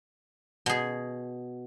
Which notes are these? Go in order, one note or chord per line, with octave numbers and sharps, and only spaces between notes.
B2 G#4